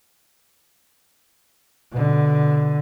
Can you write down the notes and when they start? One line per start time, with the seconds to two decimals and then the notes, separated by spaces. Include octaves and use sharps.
1.92 B2 D3